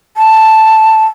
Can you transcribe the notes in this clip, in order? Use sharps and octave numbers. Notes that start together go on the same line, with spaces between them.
A5